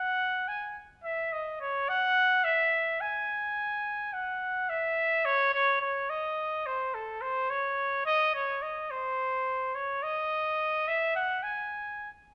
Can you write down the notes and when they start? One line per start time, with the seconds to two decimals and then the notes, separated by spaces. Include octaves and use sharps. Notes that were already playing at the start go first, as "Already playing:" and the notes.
Already playing: F#5
0.48 G#5
1.04 E5
1.33 D#5
1.61 C#5
1.89 F#5
2.44 E5
3.01 G#5
4.13 F#5
4.69 E5
5.25 C#5
5.54 C#5
5.81 C#5
6.10 D#5
6.66 C5
6.94 A4
7.21 C5
7.50 C#5
8.06 D#5
8.35 C#5
8.62 D#5
8.91 C5
9.75 C#5
10.03 D#5
10.88 E5
11.16 F#5
11.43 G#5